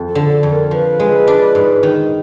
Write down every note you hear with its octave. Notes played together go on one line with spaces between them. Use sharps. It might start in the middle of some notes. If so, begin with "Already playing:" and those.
Already playing: F2
A4
D3
A4
F2
A#4
F3 B4
G#3
D4
G#2
D#3